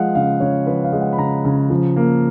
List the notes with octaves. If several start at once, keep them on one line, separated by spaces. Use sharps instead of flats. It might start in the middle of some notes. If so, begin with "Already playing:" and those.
Already playing: F3 G#3 F5 F#5
C#3 F5
C#3 C#5
F3 B4
F5
G#3
F#5
B5
C#3 A#5
C#3
F3
A#3